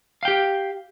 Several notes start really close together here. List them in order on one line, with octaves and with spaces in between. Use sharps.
F5 G5 G4